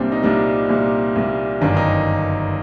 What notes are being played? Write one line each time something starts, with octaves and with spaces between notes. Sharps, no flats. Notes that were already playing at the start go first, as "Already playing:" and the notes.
Already playing: C2 A#2 G3 C4 D4
D#4
C2 A#2 G3 D4
C2 A#2 G3
C2 A#2 G3
G1 F#2 D#3 D4
D#4